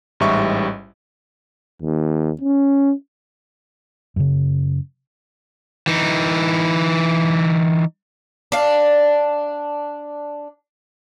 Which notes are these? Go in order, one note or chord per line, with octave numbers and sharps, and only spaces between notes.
A1 G#2 G3 E5 C#6
D#2
C#4
F#2 C#3
E3 D#4
D4 F5